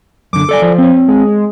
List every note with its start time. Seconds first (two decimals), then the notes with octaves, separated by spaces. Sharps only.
0.33 F#2 D3 D6
0.49 A4 D5 G#5
0.62 F3
0.78 C4 C#5
1.08 G#3